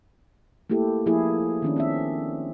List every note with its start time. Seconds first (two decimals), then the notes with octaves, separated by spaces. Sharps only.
0.70 A3 A#3 E4 G4 A4
1.06 F3 A#3 E4 G#4
1.62 D#3 C#4 D4
1.76 C4 C#4 E5